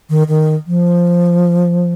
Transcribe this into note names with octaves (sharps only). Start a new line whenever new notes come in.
D#3
D#3
F3